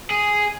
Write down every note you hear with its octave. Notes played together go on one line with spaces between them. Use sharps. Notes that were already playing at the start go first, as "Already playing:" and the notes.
G#4